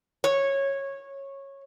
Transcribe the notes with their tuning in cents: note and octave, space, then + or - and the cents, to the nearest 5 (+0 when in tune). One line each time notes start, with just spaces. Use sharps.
C#5 -15